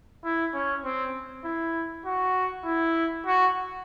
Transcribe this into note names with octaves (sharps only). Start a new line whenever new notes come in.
E4
C#4
C4
E4
F#4
E4
F#4